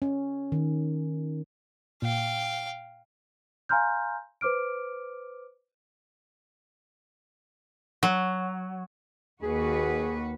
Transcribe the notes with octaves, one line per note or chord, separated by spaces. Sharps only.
C#4
D#3
A#2 F5 G5
F5 G#5 A#5 C6 F6 G6
B4 C5 D6 F6 D7
F#3
D#2 F#4 G#4 B4